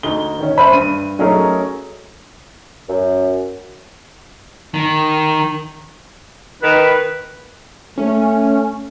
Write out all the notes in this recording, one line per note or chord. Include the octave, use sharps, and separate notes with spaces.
D2 D#4 G7
D#3 C#4
C5 E5 B5
G2 D#7
F#3 A3 C#4 D#4 G#4 A#4
F#2
D#3
D#3 B4
A3 C#4